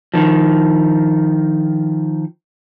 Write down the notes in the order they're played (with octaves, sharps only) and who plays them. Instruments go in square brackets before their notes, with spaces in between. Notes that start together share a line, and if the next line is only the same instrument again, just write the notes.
[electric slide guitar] D#3 F3